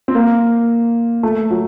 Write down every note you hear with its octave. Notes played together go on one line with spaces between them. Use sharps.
C4
A#3
A3
F#3